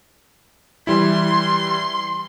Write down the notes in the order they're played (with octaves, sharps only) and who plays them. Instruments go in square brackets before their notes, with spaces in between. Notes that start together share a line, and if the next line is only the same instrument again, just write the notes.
[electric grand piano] E3 G3 E4 [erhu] C6